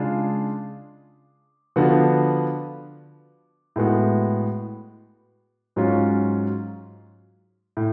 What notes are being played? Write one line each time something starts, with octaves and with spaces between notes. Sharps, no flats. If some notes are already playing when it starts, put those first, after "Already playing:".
Already playing: C#3 G#3 D4 F4 G#4
D3 F3 B3 D4 F#4
A2 G#3 B3 F#4
G#2 F#3 C#4 F4
A2